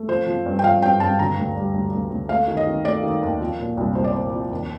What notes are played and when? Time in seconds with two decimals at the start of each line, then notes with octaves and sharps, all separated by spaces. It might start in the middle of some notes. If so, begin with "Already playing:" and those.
Already playing: A3
0.08 F3 C5
0.27 F3
0.45 G2
0.59 G5
0.63 F3 F5
0.82 G2 G5
1.00 G2 A5
1.19 D3 A#5
1.38 D2
1.56 G3
1.75 D2
1.94 D2
2.11 D2
2.29 A3 F5
2.48 D#3
2.57 D#5
2.67 D#3
2.85 A3 D5
3.03 D#3
3.23 D#2
3.41 F3
3.59 A#2
3.77 C2
3.95 C2 C5
4.04 D5
4.13 A#2 C5
4.32 F3
4.51 D#2